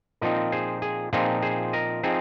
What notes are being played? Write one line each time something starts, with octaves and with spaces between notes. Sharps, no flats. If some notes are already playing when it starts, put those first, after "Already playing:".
A#2 F3 C4 D#4 A#4 D#5
G#4 C5
G#4
A#2 F3 C4 D#4 G#4
G#4 C5
A#4 D#5
F3 C4 D#4 G#4 C5